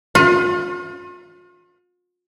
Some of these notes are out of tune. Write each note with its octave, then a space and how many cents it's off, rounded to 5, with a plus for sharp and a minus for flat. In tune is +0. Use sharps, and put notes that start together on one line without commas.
F4 +40